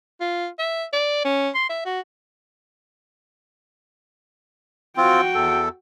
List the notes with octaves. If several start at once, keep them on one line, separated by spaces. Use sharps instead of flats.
F4
E5
D5
C#4
C6
E5
F#4
C4 F4 F#4 G5
E2 A4